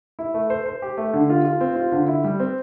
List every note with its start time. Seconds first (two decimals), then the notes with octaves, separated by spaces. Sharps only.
0.19 E4
0.34 A3
0.50 C5
0.66 C5
0.82 G4
0.97 A3
1.14 D3
1.30 F4
1.45 F4
1.61 C4
1.76 F4
1.92 D3
2.08 E4
2.24 G3
2.40 C4